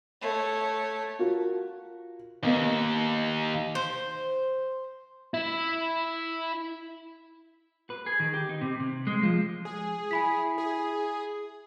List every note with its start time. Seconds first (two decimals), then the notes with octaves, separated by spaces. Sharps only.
0.21 A3 C#5
1.19 F4 F#4 A#4
2.43 D#2 A#3 B3 D#5
3.75 C5
5.34 E4 E5
7.90 B4
8.06 G#4
8.20 D#3
8.34 G4
8.49 D#4
8.61 C3
8.80 C3
9.07 G#3
9.23 F3
9.65 G#4
10.11 E4 G#5 B5 B6
10.58 G#4